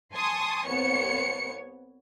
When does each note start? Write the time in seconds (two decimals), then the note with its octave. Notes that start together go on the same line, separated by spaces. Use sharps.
0.12 G#5 A5 C6 C#6 D#6
0.67 C2 B3 C#5 C#7